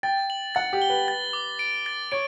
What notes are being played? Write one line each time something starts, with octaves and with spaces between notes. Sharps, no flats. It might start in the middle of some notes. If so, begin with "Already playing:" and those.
G5 A6
F#7
F#5 A6
G4
G7
B4
A6
D6
D7
A6
C#5 D7